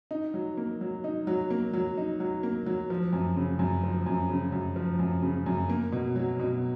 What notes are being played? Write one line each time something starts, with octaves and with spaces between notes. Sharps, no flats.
D#4
F#3
A#3
F#3
D#4
F#3
A#3
F#3
D#4
F#3
A#3
F#3
F3
F#2
C#3
F#2
F3
F#2
C#3
F#2
F3
F#2
C#3
F#2
A#3
B2
F#3
B2